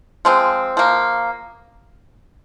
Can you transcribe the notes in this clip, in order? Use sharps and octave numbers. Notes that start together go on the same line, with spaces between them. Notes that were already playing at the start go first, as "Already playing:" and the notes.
F3 G#3 C4
F3 A#3